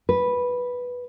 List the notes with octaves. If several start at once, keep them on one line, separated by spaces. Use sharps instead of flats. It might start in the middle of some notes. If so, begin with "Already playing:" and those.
B4